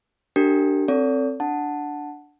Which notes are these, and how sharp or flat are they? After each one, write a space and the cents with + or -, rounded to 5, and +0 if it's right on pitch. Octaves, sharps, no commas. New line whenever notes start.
D4 +0 G4 -25 A#4 -40
C4 +10 A4 +25 D5 -45
D4 +0 F#5 +0 A5 +0